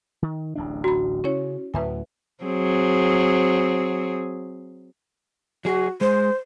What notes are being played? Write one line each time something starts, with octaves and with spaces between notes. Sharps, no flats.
D#3
D1 A1 D4
F#4 A#5 B5
C#3 C#4 E4 C#5
D2 A2 F#3 B4 E5 G#5
F#3 C4 G#4
F#3 F#4 G#4
G#3 C5